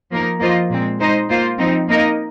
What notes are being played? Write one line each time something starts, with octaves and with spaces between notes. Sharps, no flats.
F3 A#3 D#4 A#4
F3 A#3 F4 C5 D#5
A#2 G#3 C4
G#3 D#4 C5 D#5
A#3 F4 C5
F3 C4 D#4
A#3 D#4 A#4 D#5